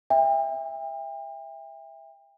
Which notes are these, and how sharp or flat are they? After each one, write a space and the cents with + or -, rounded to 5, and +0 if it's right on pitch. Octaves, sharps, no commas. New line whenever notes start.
E5 +0 G5 +40